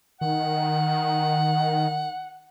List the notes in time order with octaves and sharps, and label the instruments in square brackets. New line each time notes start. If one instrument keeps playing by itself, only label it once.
[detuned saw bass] D#3 [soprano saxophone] F#5